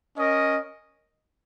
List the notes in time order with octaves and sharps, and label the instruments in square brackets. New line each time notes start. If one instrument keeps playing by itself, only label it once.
[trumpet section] C#4 A#4 D#5